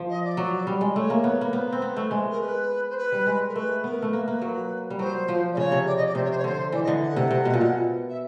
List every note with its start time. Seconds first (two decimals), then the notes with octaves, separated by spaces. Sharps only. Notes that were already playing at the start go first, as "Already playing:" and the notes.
Already playing: F3
0.09 D#5
0.24 D5
0.37 F#3
0.67 G3
0.81 G#3
0.96 A3 C#5
1.10 A#3
1.24 B3
1.41 A#3 B4
1.53 B3 C5
1.73 C4
1.82 B3
1.97 A3
2.11 G#3
2.30 A#4
2.40 B4
2.89 C5
2.97 B4
3.12 G3
3.26 G#3
3.48 A#4
3.56 A3 B4
3.84 B3 A#4
4.02 A3
4.13 A#3 B4
4.27 A#3 B4
4.41 F#3
4.90 G3
4.99 F#3 C5
5.28 F3
5.53 D5
5.57 C#3 C#5
5.72 C3
5.86 D5
5.96 D#5
6.06 D5
6.15 C3 C5
6.23 C#5
6.30 C5
6.37 C#5
6.44 D3 C5
6.72 E3 D5
6.83 D#5
6.88 D3
7.02 F#5
7.16 C3
7.31 C3
7.45 B2
7.54 A#2
7.61 B2
8.09 E5